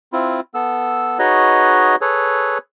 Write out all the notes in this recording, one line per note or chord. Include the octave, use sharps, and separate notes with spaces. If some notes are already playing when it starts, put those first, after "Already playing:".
C4 E4 F4
B3 A4 E6
D#4 F#4 G#4 B4 C#5 D#5
G#4 A4 B4 C#5